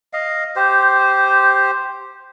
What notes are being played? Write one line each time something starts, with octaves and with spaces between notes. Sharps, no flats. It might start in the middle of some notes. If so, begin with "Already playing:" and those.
D#5 F5
G4 C5